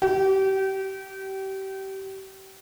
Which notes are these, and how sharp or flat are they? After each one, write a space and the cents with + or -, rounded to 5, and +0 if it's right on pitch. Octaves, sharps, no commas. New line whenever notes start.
G4 -30